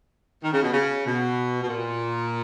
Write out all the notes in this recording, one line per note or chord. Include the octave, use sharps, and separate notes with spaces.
D#3
C#3
B2
C#3
B2
B2
A#2